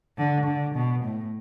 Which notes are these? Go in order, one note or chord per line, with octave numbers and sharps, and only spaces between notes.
D3
D3
B2
A2